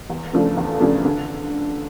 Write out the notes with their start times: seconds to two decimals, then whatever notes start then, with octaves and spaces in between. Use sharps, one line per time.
0.10 E2
0.33 C#3 F3 A3 D4
0.57 E2
0.80 C#3 F3 A3 D4
1.05 D3